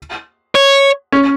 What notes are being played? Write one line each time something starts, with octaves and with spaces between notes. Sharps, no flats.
C#5
C#4